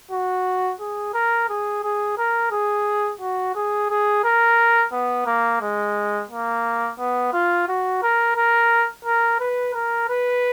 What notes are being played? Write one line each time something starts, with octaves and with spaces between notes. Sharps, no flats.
F#4
G#4
A#4
G#4
G#4
A#4
G#4
F#4
G#4
G#4
A#4
B3
A#3
G#3
A#3
B3
F4
F#4
A#4
A#4
A#4
B4
A#4
B4